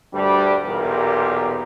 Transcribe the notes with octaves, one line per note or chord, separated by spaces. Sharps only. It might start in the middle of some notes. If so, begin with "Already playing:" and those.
D2 G2 G3
B1 E2 A#2 G4 A#4